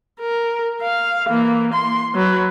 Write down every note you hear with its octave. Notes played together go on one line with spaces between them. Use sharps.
A#4
F5
E3 A#3
C6
F#3 B4